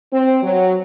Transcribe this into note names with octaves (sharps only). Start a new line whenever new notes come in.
C4
F#3